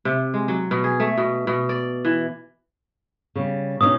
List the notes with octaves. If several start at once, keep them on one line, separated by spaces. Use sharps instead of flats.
C3
G#3
F#3
B2
G#4
A3
B2
B2
D5
E3
C#3 G3
B2 C#4 D#4 D#6